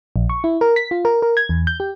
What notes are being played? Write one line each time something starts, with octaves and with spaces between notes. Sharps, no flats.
A#1
C#6
E4
A#4
B6
F4
A#4
A#4
G#6
E2
G6
G4